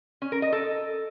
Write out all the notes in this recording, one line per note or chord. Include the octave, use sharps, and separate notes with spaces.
C#4
A#4
D#5
A4